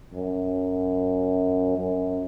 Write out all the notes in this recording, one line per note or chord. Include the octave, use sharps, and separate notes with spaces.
F#2
F#2